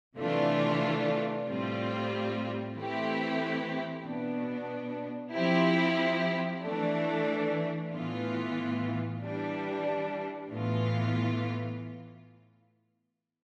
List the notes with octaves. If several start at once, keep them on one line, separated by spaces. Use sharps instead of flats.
C3 E3 A3 D4 F4
A2 G3 C4 F4
E3 A3 C4 E4 G4
B2 B3 D4
F3 C4 E4 G4
E3 A3 D4
A2 E3 B3 F4
E3 G3 D4
A2 E3 B3 F4